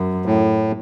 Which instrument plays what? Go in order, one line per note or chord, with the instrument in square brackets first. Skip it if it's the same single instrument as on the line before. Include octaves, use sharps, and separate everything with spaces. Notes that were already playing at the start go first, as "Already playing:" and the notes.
Already playing: [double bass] F#2
[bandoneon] A2